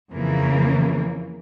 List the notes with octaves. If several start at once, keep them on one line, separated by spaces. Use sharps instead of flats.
F2 C#3 E3 A#3